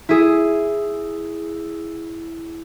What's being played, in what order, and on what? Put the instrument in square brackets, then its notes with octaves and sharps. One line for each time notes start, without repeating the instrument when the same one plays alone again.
[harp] E4 G#4